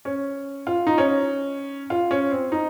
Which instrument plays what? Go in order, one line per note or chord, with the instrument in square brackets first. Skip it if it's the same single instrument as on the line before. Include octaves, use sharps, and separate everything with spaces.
[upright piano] C#4
F4
D#4
C#4
F4
C#4
C4
D#4